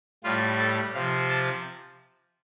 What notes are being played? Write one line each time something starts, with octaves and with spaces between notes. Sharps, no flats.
A2 G3 F4
A4
C3 F3 F5
A5